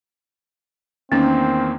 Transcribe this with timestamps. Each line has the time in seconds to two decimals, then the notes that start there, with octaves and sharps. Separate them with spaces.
1.12 E2 D#3 A#3 C4 C#4